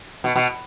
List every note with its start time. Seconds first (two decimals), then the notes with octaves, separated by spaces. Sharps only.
0.24 B2
0.36 B2